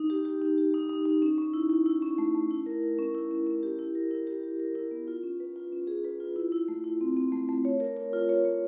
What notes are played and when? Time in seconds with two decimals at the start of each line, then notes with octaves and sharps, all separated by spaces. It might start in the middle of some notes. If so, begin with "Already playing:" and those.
Already playing: D#4
0.10 G4
0.25 G4
0.41 D#4
0.58 G4
0.74 D#4
0.89 D#4
1.06 D#4
1.22 C#4
1.38 C#4
1.54 E4
1.70 E4
1.86 E4
2.02 C#4
2.18 A3
2.35 A3
2.51 E4
2.66 A#4
2.82 A#4
2.99 C#4
3.15 E4
3.31 C#4
3.46 C#4
3.63 G4
3.79 E4
3.95 A#4
4.11 E4
4.27 G4
4.43 G4
4.59 A#4
4.75 E4
4.91 B3
5.08 F4
5.23 C#4
5.40 B4
5.56 F4
5.72 C#4
5.87 G#4
6.04 B4
6.20 F4
6.36 E4
6.52 E4
6.68 A3
6.84 E4
7.01 C4
7.16 C4
7.32 A3
7.49 A3
7.65 C#5
7.80 A#4
7.97 A#4
8.13 F4
8.29 C#5
8.45 C#5